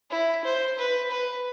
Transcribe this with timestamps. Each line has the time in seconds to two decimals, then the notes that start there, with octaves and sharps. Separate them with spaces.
0.10 E4
0.45 C5
0.78 B4
1.11 B4